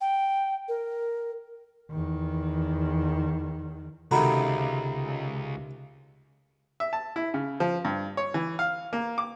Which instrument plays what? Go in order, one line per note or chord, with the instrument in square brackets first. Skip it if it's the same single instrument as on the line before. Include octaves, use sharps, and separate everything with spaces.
[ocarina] G5
A#4
[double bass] E2 D#3
[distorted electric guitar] C#2 [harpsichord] C3 D#3 F#4 [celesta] A4 A#5 B5
[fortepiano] E5
A5
E4
C#3
F3
G2
C#5
E3
F5
A#3
D6